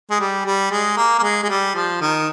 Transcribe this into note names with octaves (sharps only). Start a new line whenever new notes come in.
G#3
G3
G3
G#3
A#3
A#3
G#3
G#3
G3
F3
D#3